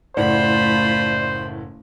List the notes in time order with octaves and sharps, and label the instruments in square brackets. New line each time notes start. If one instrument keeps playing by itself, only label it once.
[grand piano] F#1 A2 F#5 [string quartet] A3 F4 B5 [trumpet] C5 [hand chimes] D5